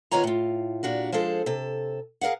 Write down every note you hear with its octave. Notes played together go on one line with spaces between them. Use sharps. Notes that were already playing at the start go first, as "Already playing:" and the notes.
D#3 B3 F4 C#5 G#5 A#5
A2 F4
A#2 D4 F#4 G4
F3 G#3 G#4 A4 C5
C3 A4
G#4 A#4 B4 F5 F#5